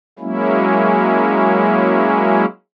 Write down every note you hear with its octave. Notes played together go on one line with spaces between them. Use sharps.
F#3 G#3 A#3 C#4 E4